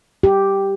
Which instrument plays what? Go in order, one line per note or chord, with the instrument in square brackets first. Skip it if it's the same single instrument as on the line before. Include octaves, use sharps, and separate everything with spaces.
[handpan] G4